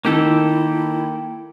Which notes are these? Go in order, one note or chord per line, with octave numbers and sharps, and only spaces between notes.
D#3 A#3 E4 G4 A4